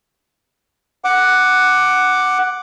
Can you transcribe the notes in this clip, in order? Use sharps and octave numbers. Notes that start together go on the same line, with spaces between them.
F#5 D6